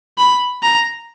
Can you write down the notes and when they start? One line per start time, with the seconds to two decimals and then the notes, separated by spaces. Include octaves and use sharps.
0.18 B5
0.63 A#5